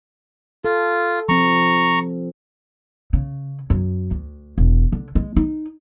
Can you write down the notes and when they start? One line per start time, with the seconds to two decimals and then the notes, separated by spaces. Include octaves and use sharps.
0.65 F4 A4
1.29 F3 C4 A#5 C#6
3.13 C#3
3.70 F#2
4.11 D2
4.58 E1
4.92 D3
5.15 G#3
5.36 D#4